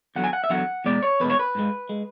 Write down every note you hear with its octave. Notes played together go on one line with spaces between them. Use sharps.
E2 D3 F#3 F#5
G#5
F#5
E5
E2 D3 F#3 F#5
E2 B2 G#3 D5
C#5
E2 B2 G#3 B4
C#5
B4
G#2 G#3
G#3